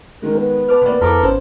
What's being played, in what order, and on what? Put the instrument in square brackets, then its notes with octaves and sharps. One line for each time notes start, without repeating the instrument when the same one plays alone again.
[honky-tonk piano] D#3 G#3 [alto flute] A#4
[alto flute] B3
[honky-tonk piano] B4 [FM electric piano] A5 D6 F6
[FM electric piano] C3 E3 A#3 [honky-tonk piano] D5 B5
[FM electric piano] F2 B5 [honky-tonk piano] E4 D6 [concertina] A4 A#4
[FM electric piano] G#1 C#4 [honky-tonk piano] C5